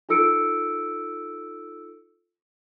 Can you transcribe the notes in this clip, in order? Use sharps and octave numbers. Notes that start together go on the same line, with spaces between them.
D#4 F4 A4 E6 C#7 D7